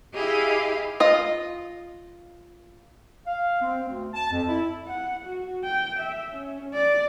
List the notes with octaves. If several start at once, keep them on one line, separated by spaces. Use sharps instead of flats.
E4 G4 G#4 D#5 F5
F4 D#5
F5
C4
D2
A5
F2
E4
F#5
F#4
G5
E5
C#4
D5